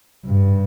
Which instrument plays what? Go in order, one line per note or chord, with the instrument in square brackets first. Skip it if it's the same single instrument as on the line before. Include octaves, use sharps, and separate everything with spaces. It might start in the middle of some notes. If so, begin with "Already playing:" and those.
[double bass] G2